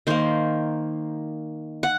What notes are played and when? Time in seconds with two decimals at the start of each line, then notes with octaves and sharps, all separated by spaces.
0.07 D#3 A#3 C5
1.83 F#5